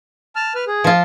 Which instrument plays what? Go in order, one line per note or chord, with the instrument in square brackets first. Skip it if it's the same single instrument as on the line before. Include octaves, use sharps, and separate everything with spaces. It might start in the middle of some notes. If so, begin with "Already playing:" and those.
[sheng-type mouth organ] A5 F6
B4 F6
G#4
[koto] F3 F4